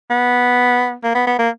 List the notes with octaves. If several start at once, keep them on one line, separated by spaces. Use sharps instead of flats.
B3
A#3
B3
B3
A#3